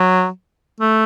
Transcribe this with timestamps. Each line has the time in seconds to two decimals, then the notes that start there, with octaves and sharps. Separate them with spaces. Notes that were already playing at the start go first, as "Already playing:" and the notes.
Already playing: F#3
0.80 A3